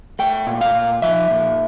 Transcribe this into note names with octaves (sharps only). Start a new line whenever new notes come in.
A3 G5
A#2
F5
A#2
F3 E5
A#2